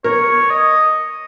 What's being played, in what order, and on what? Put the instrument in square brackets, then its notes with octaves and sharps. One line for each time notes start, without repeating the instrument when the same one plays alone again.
[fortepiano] A#4 [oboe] C#5
[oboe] D#5